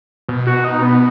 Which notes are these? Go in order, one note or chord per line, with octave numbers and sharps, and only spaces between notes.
B2
F#4
D#4
B3